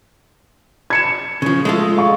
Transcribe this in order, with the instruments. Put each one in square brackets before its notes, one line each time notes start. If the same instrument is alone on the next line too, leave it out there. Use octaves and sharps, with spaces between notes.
[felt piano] G#6 C#7 E7
[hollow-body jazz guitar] C#3 F3
G#3 A3 F4
[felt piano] F5 C#6